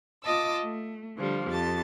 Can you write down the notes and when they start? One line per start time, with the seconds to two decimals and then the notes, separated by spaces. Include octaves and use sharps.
0.23 F4 D#5 A5 D6 E6
0.64 A3
1.17 D3 F3 G3
1.49 F2 G4 A5 A6